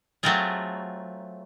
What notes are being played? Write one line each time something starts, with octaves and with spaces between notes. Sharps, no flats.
F#3 A3 C4 F4 G#4